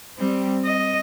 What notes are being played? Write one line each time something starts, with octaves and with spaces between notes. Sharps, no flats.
G3 C4
D#5